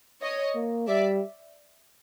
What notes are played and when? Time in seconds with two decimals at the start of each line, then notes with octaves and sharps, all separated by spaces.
0.22 C#5 D#5
0.55 A#3
0.88 G3 D5 E5